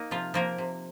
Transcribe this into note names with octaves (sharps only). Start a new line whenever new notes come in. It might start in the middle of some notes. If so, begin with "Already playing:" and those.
Already playing: A#3 D#4
C3 F3 F4
F3 A#3 A#4
C3